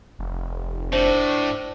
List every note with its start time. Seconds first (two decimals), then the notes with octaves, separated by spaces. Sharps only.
0.19 F1
0.93 A2 D4 C5